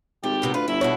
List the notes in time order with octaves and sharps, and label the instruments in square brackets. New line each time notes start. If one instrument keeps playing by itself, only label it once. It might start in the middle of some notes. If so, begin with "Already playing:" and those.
[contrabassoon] G#1 [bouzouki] A3 [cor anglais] G4
[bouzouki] A2 C3 B3
[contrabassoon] D2 [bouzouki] F4 [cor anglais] B4
[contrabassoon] G1 [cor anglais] E4 [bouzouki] E5
[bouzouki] B2 D4 F#4 [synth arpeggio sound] C#5